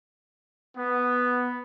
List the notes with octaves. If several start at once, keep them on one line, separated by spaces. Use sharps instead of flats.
B3